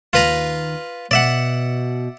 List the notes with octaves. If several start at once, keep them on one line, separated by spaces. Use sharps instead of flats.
D#2 F4 B4 A#5
B2 D5 E5 F#5